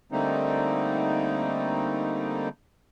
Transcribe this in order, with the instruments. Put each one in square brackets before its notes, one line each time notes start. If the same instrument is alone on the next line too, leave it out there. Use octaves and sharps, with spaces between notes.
[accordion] D3 G3 A3 A#3 C4 D#4